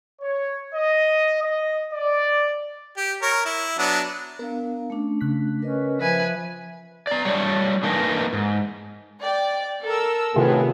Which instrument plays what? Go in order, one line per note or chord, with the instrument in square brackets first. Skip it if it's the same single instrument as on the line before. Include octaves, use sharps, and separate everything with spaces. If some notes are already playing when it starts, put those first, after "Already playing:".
[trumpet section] C#5
D#5
D#5
D5
[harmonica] G4
A#4 C#5
E4
F#3 B3 D4
[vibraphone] B3 D4 F5 [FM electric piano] A#4
[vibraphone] A3 C#4 D4
[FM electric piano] C#3 F#6 B6
[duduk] C#4 [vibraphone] A#4 B4 D#5
[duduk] F3 [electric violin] B4 G#5 [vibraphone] E5
[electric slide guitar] D5 A#5
G3 A3 G4 C#5 D5
D3 E3 A3 A#3 D#4 A#4
G#2
[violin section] D5 G5
A4 A#4 E6
[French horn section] A2 G#4 [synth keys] C3 D#3 F4 [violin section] B3